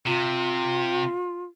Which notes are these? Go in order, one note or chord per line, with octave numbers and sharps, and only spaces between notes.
C3 F4